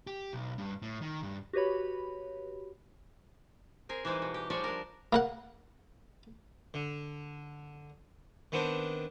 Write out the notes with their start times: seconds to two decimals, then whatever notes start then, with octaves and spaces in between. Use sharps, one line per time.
0.07 G4
0.33 B1
0.58 G2
0.82 A2
1.02 D#3
1.23 G2
1.53 F#4 G4 B4 C#5 B5
3.89 C4 G#4 A#4
4.05 E3 G3 G#3 C4 D#4
4.22 B2
4.34 G4
4.50 F3 G3 G#3 G4 C#5 D5
4.64 D4 A#4
5.13 A#3 A#4 F#5
6.74 D3
8.52 D#3 B3 C4 D4